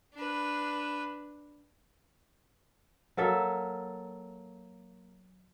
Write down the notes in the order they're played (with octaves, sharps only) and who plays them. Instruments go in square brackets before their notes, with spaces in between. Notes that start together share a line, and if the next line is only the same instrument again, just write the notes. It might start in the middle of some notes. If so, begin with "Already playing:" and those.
[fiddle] D4 B4
[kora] F#3 A#3 A4 E5